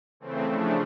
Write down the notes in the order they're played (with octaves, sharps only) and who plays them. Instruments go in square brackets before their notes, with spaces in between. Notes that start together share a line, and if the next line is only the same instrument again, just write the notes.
[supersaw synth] C#3 E3 A3 C4
C#3 F3 A3 D4